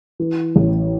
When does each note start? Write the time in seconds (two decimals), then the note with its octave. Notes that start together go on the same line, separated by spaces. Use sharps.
0.20 E3
0.56 A1